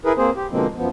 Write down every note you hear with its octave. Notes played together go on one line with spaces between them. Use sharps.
E4 G#4 A#4 B4
A#3 C4 G#4 C5
G4
B2 D3 F3 G#3 A#3 C4
F#2 F3 B3